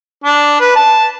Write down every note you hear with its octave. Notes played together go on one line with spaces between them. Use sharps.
D4
B4
A5